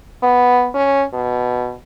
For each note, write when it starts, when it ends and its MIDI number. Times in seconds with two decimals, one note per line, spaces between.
0.22 0.69 59
0.74 1.05 61
1.13 1.74 47